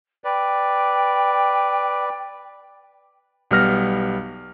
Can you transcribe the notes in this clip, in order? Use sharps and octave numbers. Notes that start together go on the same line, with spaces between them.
B4 D5 G5
B1 G3 B3 F6 A#6